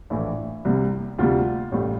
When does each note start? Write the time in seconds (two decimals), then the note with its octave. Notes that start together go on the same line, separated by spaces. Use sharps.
0.10 A#1 A2 E3 E4
0.65 C2 C3 G3
1.19 D2 C3 G3 F4
1.72 A1 A2 G3